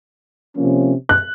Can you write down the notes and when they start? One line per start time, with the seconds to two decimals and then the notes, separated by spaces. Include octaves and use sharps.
0.56 C3 F3 A#3 C#4
1.09 F#6